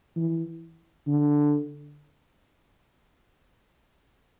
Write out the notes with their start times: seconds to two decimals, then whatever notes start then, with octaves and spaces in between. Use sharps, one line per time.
0.16 E3
1.07 D3